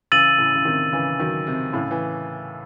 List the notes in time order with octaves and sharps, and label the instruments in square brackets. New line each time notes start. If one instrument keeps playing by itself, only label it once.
[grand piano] C#3 E3 [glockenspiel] E6 A6 D#7 F#7
[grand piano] A2 C#3
C#3
C3 D#3
C#3 E3
D#3 F#3
C3
A2 C#3
E3